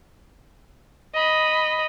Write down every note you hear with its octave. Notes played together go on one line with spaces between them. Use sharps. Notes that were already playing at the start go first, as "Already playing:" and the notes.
D#5 B5